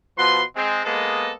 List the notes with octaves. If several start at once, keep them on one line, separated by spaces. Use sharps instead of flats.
B2 F3 B4 C6
G#3 C4
G#3 A#3 B3 A4 D#5